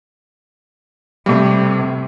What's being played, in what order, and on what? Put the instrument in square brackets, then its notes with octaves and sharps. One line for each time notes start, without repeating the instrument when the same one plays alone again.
[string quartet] C3 [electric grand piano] G3 A3